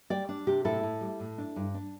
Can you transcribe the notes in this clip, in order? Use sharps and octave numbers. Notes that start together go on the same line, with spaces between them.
G3 D5 G5
D4
C3 G4
A2 E4 A4
A2
G3
A2
D4
G2
D4